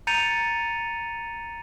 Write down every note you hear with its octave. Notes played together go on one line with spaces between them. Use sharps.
A#5 G6 A6 C#7 D#7 F7